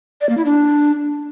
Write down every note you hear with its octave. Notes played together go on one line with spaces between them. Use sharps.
D5
A#3
E4
D4